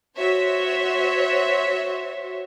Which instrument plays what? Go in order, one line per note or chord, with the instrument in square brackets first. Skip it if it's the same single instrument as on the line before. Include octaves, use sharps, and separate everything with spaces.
[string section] F#4 C5 C#5 E5